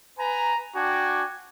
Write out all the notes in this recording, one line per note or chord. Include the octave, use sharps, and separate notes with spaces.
B4 G#5 A#5
D4 F#4 G5 G#5 D6